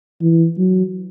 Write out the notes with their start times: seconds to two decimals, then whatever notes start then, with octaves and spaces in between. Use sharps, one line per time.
0.22 E3
0.58 F#3